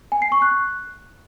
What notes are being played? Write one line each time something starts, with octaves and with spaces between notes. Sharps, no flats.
G#5
C7
C#6
F#6